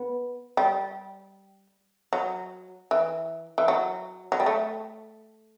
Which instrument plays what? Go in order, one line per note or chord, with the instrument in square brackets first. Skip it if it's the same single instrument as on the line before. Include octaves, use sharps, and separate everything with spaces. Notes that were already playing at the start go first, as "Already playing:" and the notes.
Already playing: [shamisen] B3
G3
F#3
E3
E3
F#3
F#3
G3
A3